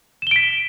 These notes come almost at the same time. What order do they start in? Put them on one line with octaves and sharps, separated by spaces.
E7 G7 D7 B6